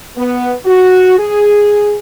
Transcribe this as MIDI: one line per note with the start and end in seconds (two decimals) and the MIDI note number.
0.17 0.54 59
0.66 1.18 66
1.19 1.95 68